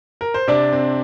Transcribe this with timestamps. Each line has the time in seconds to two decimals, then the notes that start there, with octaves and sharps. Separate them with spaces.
0.21 A#4
0.34 C5
0.48 C3 D4 D5
0.73 C4